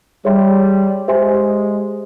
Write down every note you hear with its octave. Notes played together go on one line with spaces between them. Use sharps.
G3 G#4 C#5 E5 G5 C6
G#3 G4 C5 E5 G#5 C6